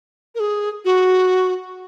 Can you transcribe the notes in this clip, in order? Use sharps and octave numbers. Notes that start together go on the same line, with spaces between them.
A#4
G#4
F#4